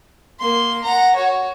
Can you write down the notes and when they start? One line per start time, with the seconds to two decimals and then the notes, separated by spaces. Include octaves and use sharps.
0.39 A#3 C6
0.84 F#5 A#5
1.16 F#4 C#5